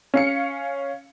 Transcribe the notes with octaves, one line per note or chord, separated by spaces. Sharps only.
C#4 F5 C#7